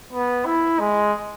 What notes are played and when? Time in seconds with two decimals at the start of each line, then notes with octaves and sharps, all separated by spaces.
0.13 B3
0.46 E4
0.80 G#3